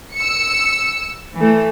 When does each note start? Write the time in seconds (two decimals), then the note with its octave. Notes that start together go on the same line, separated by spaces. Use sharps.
0.13 E6 C#7
1.36 E3 A3